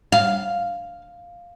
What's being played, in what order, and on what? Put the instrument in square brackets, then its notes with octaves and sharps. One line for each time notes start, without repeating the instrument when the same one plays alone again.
[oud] F5